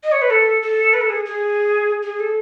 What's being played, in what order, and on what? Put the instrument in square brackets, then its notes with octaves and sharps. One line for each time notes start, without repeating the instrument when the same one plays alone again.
[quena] D#5
C#5
B4
A4
A4
B4
A4
G#4
G#4
G#4
A4